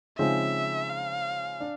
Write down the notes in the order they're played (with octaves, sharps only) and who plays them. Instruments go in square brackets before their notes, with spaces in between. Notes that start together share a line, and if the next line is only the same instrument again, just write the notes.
[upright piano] C#3 F3 G#3 C4 D#4 [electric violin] E5
[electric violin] F5
[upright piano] D4